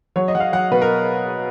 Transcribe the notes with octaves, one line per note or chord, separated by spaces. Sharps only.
F#3 C#5
D#5
F#3 F#5
F5
F#3 F#5
B2 B4
A#4